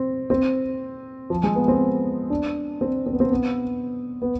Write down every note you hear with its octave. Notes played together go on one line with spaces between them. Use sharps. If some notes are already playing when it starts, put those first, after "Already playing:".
Already playing: C4
C4
F3
G#3
B3
C4
D4
C4
C4
B3
C4
B3
B3